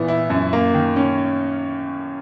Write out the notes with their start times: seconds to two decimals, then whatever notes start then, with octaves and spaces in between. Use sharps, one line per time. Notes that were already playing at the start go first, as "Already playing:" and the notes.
Already playing: A#2 E3 B3
0.08 E4
0.30 F#2
0.53 A#3
0.74 D#3
0.96 C#4